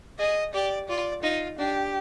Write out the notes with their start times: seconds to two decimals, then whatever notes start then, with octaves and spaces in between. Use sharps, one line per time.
0.19 G#4 D#5
0.54 G4 D5
0.89 F4 D5
1.23 D#4 F4
1.58 D4 G4